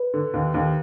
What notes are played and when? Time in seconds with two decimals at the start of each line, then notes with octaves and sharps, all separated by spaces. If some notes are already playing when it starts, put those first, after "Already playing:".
Already playing: B4
0.14 D3
0.34 D#2
0.54 D#2